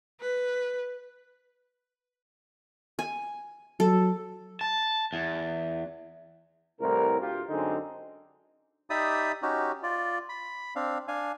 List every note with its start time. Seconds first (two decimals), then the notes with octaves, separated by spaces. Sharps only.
0.21 B4
2.99 G#5
3.80 F#3 A4
4.61 A5
5.13 E2
6.80 C2 A2 C3 E3 A#4
7.19 D2 F4 G4
7.49 F#2 D3 G#3 C4 D4 D#4
8.90 D#4 G4 D5 E5 B5 D#6
9.42 C#4 D#4 F#4 G4
9.83 F4 D5
10.29 B5
10.76 C4 D4 F5
11.08 D4 F5 G#5